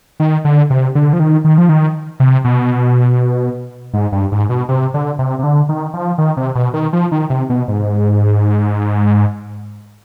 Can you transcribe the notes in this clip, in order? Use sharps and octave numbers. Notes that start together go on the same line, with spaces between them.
D#3
D3
C3
D3
F3
D#3
D#3
F3
D#3
C3
B2
G#2
G2
G#2
B2
C3
D3
C3
C3
D3
D#3
F3
D#3
C3
B2
D#3
F3
D#3
C3
B2
G#2